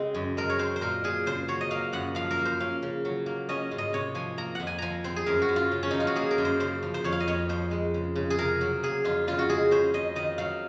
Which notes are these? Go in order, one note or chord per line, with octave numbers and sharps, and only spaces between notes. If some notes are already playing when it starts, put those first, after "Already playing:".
Already playing: C#3 G#3 C4 G#4
F#2
G#3 A#4
C#5
C4 C5
C5
A#2 A#4
A#2 G#4
C#3 C5
F#3 C#5
D#5
A#3 F5
F#2 F#5
F3 F5
A#4
A#3
C5
C#4 F5
C#3
F#3
A#3
C#4 D#5
G#2
D#5
C3 C#5
F3 G#5
A#3 A#5
F2 F#5
G#5
F3 G#5 A#5
C4 C5
G#4
F#2 A#4
F#4
F#2
F4
C#3
C#4
F3 D#4
F4
F#4
A#3 G#4
A#4
F#2
C5
C#3 C5
F3
C5
F2 C#5
F5
D#5
F2 C#5
F3 C5
G#3
C#3
C#3
G#4
C3 A#4
F#3
A#3 G#4
F2 F4
C#3 F4
F#4
G#3 G#4
C#4 C5
F2 D#5
D#3 D#5
F#3 F5